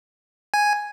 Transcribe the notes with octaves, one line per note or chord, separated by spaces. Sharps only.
G#5